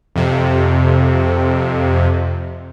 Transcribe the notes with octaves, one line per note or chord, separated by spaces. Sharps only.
F2 C3